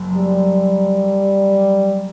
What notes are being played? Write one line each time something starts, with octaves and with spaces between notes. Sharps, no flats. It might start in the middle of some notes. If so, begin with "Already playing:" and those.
Already playing: F#1 F#2
G3